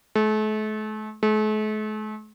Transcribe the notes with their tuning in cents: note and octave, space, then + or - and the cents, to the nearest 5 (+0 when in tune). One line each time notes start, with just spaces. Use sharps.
A3 -40
A3 -45